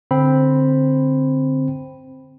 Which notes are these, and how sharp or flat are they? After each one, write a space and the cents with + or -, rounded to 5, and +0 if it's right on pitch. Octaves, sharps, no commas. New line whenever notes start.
D3 +0 C4 +0 B5 +0